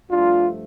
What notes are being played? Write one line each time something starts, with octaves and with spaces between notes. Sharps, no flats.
G2 F3 A3 D4 F4